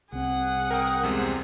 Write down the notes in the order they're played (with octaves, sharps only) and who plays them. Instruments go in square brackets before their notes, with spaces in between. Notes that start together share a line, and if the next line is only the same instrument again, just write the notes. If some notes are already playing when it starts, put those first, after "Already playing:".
[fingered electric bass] C2 C4 [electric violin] G#4 F#5
[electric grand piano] A#4 G5 D#6
E2 C3 G#3